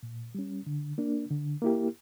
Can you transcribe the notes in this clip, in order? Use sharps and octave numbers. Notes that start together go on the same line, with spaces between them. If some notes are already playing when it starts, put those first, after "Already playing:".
A#2
G3 C#4
D3
A#3 D4
D3
A#3 E4 G4